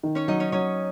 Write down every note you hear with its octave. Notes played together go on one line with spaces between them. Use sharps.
D#3
C#4 C#5
F#3 D#4 D#5
C#4 C#5
F#3 C#4 C#5